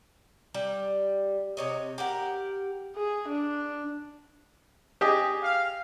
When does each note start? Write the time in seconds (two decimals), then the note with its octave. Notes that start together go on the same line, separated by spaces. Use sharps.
0.54 G3
1.57 C3 C#5 D#5
1.98 G4 A#4 F#5
2.95 G#4
3.28 D4
5.01 G4 G#4 D#5
5.42 F5